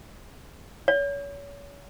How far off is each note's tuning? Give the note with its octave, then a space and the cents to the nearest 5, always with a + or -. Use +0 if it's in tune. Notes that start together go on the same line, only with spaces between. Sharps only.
C#5 +35